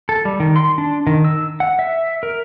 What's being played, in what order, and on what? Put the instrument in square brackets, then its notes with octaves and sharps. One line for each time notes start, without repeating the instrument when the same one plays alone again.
[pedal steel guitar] A4
G3
D#3
C6
D4
D#3
E6
F#5
E5
A#4